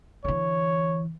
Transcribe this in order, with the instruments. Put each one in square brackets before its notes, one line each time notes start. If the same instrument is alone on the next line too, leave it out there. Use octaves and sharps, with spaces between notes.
[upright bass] D3 E3 [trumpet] C#5